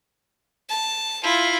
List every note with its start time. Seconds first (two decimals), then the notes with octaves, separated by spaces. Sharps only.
0.70 A5
1.24 E4 F4